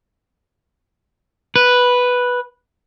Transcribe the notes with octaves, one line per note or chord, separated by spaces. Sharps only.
B4